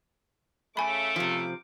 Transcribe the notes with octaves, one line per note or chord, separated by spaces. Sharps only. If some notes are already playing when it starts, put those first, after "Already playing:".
C#3 A3 G#5 B5 D6
C3 F3